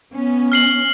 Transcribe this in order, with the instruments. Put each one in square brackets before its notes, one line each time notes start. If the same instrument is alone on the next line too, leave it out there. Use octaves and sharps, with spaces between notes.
[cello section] B3 C#4
[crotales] F6 C7 F#7